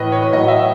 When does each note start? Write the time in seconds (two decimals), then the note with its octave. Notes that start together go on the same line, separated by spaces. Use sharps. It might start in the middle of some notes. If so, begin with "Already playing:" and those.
Already playing: A2 E3 B4 D#5
0.12 C#5
0.22 B4
0.33 A2 F#3 D#5
0.48 E5